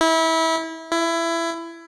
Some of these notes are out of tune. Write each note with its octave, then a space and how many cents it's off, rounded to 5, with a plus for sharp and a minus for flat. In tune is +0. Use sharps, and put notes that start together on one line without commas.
E4 -25
E4 +20